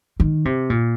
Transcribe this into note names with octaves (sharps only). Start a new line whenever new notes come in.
D#3
C3
A#2